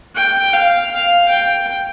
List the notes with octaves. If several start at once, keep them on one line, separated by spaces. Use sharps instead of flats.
G5
F5
F5
G5